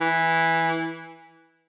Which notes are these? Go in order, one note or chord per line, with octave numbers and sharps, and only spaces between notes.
E3